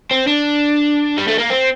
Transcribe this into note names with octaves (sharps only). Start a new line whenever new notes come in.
C4
D4
G3
A3
A#3
C4